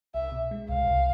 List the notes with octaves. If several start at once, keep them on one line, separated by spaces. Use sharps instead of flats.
C2 E5
B2
G#3
C2 F5
C2